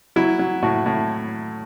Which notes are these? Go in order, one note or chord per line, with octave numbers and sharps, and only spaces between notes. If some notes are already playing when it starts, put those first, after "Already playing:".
F#3 E4
F#3
A2 F#4
A2